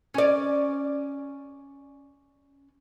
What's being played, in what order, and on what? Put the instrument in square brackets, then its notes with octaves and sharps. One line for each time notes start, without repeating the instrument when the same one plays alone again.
[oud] C#4 D5